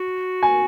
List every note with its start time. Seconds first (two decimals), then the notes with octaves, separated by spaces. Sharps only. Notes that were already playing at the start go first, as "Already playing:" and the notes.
Already playing: F#4
0.43 G#5